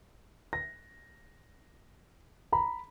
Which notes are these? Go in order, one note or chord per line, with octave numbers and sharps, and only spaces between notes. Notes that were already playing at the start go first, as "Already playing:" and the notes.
A#6
A#5 B5